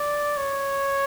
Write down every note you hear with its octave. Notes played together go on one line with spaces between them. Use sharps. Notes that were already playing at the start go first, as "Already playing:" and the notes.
Already playing: D5
C#5